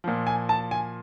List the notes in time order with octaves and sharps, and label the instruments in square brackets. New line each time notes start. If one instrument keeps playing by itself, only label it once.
[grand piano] A#2 F3
G#5
A5
G#5